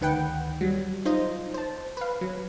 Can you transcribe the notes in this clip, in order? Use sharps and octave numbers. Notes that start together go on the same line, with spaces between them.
D2 D#3 B4 F#5 G5
F#3 G3
D#4 F4 C5 D#5
C5 A5
B4 F5
F#3